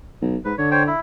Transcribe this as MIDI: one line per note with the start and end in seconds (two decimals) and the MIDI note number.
0.22 0.37 35
0.45 0.53 44
0.45 0.56 71
0.58 0.90 50
0.58 0.69 73
0.71 0.83 72
0.71 0.83 73
0.71 0.83 79
0.87 1.00 64